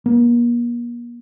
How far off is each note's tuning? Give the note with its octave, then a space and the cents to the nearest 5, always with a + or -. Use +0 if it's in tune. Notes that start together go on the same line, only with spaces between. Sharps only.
A#3 +40